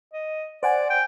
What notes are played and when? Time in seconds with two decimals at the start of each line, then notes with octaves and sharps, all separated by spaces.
0.13 D#5
0.63 C5 D5 F#5 G#5
0.90 G5